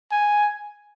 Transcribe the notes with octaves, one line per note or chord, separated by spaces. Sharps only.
G#5